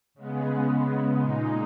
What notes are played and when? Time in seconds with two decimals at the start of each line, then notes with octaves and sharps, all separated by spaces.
0.14 C#3 G#3 B3
1.17 A#2 G#3 D#4